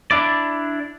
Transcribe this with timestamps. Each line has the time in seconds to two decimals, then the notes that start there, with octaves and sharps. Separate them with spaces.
0.11 D4 E4 D5